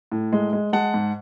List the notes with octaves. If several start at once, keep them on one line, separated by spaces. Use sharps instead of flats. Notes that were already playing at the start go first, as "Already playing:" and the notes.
A2
G#3
G#3
G#3 F#5 A5
G#2